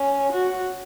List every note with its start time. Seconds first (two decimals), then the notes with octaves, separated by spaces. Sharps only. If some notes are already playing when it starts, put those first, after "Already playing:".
Already playing: C#4
0.33 F#4